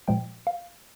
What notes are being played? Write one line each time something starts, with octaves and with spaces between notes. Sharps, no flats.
A#2 F3 G#3 G5
F5